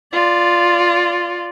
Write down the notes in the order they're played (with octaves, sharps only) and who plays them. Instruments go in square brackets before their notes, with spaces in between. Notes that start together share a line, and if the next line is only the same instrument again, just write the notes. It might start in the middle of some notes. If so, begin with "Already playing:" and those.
[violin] F4 D5